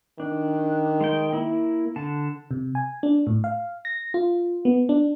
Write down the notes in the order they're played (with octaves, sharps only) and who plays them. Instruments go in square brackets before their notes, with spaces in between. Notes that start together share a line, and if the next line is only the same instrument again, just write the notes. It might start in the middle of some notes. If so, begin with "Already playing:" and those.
[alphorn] D#3 [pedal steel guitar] D4
[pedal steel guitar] G#3 G5
A#3 E4
D3 A5
[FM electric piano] C3
G#5
D4
A2
F5
A#6
F4
B3
D4